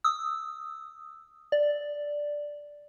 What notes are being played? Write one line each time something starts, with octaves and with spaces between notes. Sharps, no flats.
D#6 E6
D5